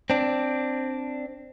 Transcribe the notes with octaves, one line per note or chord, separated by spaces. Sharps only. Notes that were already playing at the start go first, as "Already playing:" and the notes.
C4 D4